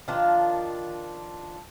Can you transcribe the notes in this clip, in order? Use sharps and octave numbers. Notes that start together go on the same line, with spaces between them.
D#3 F3 D4 F4